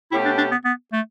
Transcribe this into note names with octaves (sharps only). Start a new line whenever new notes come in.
B2 A3 C#4 E4 G4
D4
D4
B3
B3
A3